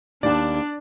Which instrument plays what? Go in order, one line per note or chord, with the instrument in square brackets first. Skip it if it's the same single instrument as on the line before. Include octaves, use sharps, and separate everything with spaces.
[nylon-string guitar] D#2 A5 [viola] D4 [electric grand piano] D5